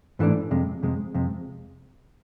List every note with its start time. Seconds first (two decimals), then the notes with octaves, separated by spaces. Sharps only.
0.19 G#2 E3 A3 D4
0.51 F2 C3 G#3
0.83 F2 C3 G#3
1.14 F2 C3 G#3